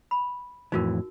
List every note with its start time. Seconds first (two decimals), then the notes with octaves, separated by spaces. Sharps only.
0.11 B5
0.72 F2 A2 E3 D#4 F#4 A#4